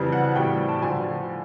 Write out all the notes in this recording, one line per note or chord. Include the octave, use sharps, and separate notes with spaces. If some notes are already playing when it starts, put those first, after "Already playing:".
Already playing: F2 C#3 E3 G3
F#5
A2 E3 G3 G5
A5
D3 F3 G#5